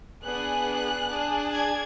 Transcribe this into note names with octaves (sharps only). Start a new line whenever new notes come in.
B3 D4 G#4 F#6
D4 G#4
G#6